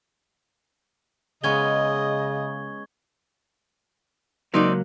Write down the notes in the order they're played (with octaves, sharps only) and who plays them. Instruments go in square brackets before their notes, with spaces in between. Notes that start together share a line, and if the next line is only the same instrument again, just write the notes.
[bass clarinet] C#3 [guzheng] G#3 B3 C#4 [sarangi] D#5 [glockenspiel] C#6 G#6 G7
[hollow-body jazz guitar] C#2 F#3 A#3 [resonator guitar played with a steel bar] C4 D#4 D5